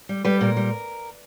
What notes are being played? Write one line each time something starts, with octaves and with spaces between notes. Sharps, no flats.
G3
G3 B4
A#2 A#4
G3